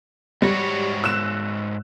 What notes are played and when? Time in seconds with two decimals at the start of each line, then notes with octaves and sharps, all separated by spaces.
0.42 G#2 G3 F#4 C#5
1.04 E6 F#6 E7